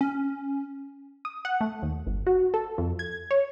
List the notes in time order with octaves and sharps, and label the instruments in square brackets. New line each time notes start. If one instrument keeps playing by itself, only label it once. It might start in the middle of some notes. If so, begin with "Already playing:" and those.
[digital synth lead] C#4
[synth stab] D#6
F#5
A3
D#2
G1
F#4
A4
F2
G#6
C#5